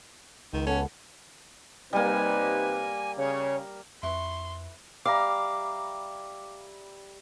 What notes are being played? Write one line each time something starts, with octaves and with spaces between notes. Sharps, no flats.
C#2 D#3
B3 C#4 A4
C3 G3 A#3 D#4 B4 G#5
C#3 C#5
F2 E4 B4 C6 C#6
G3 E5 F5 A#5 D6